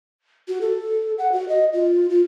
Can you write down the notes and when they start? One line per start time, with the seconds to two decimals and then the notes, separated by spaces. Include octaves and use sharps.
0.48 F#4
0.61 A4
1.18 F#5
1.32 F#4
1.49 D#5
1.73 F4
2.10 F4